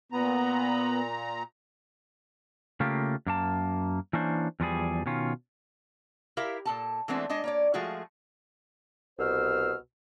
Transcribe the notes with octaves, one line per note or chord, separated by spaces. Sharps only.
A#2 B3 A#5
C#3 A3 A#3 F4 G4
F#2 A#3 A5
E3 A#3 C#4 D4 C5
E2 F3 G3 G#4
B2 D#3 C#4 F4
E4 G4 A#4 E5 F5
A#2 A4 A5
E3 G#3 A3 B3 C4 D4
G#3 D4 D#5
A#3 C#5 D5
F3 G#3 A3 F4 F#4 G#4
C2 B2 C5 E6 F6